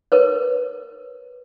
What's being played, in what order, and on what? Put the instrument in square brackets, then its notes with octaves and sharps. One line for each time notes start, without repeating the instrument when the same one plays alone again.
[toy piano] A#4 B4 C#5